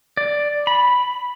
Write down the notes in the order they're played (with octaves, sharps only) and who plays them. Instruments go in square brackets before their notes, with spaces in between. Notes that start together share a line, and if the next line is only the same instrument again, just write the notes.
[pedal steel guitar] D5
B5